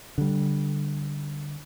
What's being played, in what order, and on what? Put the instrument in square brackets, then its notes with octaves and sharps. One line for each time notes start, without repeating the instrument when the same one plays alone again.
[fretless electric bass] D3 G3